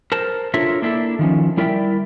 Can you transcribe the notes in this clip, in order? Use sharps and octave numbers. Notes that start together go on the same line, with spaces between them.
A#4 C5 A5
D4 F4 A4 A#4 C#5 E5
A#3 D4 E4 F4 A4
D#3 F3 C#4
G3 E4 A#4 D5 E5 G5